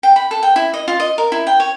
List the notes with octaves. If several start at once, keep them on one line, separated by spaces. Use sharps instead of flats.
G5
B5
A4
G5
E4
D#5
F4
D#5
A#4
E4
G5
C#5